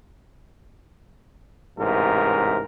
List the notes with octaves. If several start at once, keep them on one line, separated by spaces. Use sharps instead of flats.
A1 G#2 C3 A#4